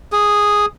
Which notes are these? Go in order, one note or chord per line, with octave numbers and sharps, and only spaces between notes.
G#4